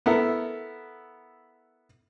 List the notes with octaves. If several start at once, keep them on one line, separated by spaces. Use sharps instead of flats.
B3 E4 A4 A#4